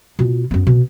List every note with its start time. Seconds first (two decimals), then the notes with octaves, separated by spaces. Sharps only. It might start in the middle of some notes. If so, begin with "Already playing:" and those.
0.19 B2 F4
0.51 F#2 B3
0.67 B2